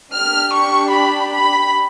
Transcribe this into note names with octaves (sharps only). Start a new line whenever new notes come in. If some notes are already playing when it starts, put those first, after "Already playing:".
D4 G4 F6
C#6
B5
B5